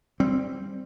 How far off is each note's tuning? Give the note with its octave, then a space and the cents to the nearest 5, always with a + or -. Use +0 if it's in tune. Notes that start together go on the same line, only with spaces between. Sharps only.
G3 +5 C4 +0